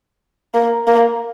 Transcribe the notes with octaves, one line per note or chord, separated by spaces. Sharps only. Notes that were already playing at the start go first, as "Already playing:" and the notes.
A#3
A#3